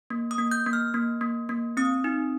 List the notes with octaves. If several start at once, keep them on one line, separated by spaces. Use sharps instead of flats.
A#3
D#6
A#3
G6
A#3
F6
A#3
A#3
A#3
C4 D#6
D#4